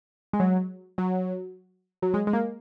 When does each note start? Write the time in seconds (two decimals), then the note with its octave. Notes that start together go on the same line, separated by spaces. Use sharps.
0.33 G#3
0.40 F#3
0.98 F#3
2.02 F#3
2.14 G#3
2.27 G#3
2.33 A#3